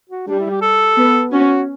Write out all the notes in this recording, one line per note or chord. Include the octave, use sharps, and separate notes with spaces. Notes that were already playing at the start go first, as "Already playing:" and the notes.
F#4
G3 D4
E4
G4
A4
B3
C#4 F#4